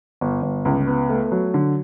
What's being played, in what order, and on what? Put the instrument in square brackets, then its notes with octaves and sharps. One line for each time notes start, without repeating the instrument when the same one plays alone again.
[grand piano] G1
G1
C#2
B3
A3
F#3
D3